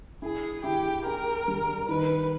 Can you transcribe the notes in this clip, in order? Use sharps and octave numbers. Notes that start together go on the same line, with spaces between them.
E4 G#4
E4 G4
G#4 A#4
G3
D#3 B4